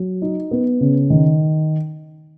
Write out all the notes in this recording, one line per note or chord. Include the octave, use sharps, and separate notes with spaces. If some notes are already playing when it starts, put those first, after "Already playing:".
Already playing: F#3
D#4
B3
C#3
D#3